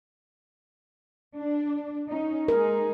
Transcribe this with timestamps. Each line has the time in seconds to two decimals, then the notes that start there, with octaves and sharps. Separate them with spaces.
1.35 D4
2.08 C#4 D#4
2.48 G#3 D#4 G#4 A#4